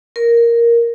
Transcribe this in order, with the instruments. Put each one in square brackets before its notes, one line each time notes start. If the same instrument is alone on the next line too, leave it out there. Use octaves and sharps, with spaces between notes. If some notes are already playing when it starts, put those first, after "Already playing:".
[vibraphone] A#4